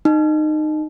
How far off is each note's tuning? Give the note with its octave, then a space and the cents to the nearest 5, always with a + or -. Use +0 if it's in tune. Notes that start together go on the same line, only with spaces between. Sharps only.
D#4 -20